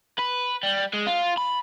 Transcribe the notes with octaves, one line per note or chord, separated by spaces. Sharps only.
B4
G3
G#3
F4
B5